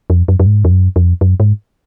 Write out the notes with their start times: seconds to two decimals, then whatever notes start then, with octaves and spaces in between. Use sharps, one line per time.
0.10 F2
0.28 F#2
0.40 F#2
0.46 G#2
0.65 F2
0.71 F#2
0.96 F2
1.21 F#2
1.40 G#2